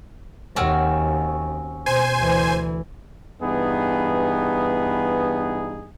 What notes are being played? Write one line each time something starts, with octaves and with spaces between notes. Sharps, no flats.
D#2 C4 C#4 F#4
B2 C5 G#5
D2 E3
G2 E3 B3 D#4 G#4